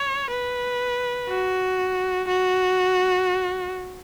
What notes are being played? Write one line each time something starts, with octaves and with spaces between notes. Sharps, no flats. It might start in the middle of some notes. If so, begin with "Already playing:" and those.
Already playing: C#5
B4
F#4
F#4